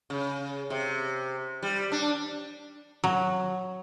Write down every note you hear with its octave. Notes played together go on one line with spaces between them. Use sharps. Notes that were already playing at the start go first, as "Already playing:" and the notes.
C#3
C3
G3
D4
F#3